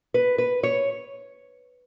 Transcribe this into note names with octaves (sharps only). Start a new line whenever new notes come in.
B4
B4
C#5